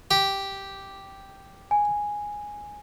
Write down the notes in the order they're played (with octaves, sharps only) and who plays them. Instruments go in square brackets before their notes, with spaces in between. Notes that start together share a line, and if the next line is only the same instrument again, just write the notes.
[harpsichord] G4
[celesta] G#5